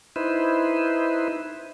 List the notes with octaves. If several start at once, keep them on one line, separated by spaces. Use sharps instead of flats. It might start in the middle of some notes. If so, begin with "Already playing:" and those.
D#4 E4 B4 C5